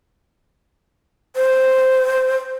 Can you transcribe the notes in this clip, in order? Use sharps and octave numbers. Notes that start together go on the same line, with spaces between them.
C5